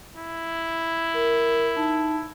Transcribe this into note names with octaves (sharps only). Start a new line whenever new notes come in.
E4
A#4
D#4 A5